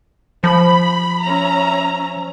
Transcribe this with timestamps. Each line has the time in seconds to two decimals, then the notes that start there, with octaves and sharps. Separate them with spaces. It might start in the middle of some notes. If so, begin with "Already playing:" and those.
0.44 F3 B5
1.24 C#4 E5 A#5